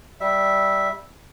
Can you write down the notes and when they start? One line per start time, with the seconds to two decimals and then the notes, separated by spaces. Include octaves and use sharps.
0.20 G3 E5